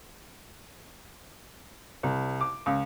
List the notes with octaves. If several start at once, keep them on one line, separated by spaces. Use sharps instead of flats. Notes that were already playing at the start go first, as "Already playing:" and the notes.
C2
D6
C#2